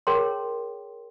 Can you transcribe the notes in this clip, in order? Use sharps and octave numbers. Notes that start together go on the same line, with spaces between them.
G#4 A#4 C#5 G5 A#5 C6